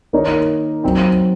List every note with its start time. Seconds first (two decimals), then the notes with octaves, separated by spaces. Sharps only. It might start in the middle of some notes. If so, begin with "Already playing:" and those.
0.13 D#3 A#3 D#4 A#4 C#5
0.84 F#3 C4 D#4